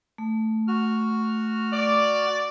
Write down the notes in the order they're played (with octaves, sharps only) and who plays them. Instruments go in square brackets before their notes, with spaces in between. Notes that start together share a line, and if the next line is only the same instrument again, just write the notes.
[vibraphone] A3
[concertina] F#4 F6
[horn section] D5